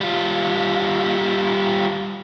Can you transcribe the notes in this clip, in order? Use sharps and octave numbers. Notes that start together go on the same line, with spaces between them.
G3 F4